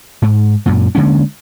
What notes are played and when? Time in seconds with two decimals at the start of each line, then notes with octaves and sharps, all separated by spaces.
0.22 G#2
0.66 F#2 A#2
0.95 D3 G#3 A#3 C#4